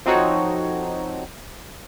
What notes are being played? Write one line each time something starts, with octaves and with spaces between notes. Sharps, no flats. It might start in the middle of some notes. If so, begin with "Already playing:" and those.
F3 C4 D#4 F#4 A4 C#5